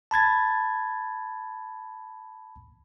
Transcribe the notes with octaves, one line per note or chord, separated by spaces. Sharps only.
A5 B5 G#6 A6